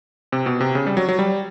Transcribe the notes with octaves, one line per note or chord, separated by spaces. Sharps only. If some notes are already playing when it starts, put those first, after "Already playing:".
C3
B2
C3
C#3
G3
F#3
F#3
G3